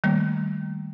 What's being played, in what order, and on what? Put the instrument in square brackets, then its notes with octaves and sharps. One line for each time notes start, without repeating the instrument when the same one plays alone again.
[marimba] D#3 G3 A3 A#3